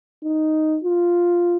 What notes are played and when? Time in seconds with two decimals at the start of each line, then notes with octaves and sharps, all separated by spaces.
0.23 D#4
0.84 F4